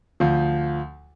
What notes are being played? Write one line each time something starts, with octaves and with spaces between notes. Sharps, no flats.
D2 F3